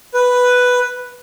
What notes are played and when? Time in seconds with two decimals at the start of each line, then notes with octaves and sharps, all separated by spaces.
0.14 B4